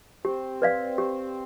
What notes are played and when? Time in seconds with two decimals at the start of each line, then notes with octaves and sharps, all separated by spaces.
0.24 C4 G4
0.62 B4 D5 F5
0.98 G4